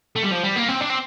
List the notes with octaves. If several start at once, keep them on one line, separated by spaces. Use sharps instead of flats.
A3
G3
F3
G3
A#3
C4
D4
C4